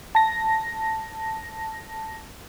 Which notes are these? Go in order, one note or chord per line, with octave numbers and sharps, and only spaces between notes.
A5 A#6